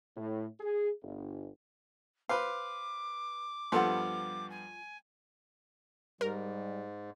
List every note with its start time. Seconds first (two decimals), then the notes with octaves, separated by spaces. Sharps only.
0.17 A2
0.60 G#4
1.02 G1
2.29 B4 C5 F5 D6
3.72 G2 F3 B3 F4 A4 F#5
4.50 G#5
6.21 G#2 G3 A#4